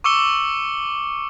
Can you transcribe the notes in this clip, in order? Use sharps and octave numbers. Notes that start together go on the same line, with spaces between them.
C#6 D6 E6 C#7 G7